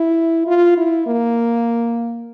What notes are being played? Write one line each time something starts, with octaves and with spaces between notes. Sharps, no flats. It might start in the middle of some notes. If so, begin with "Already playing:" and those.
Already playing: E4
F4
E4
A#3